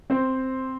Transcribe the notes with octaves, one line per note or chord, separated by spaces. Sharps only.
C4 C5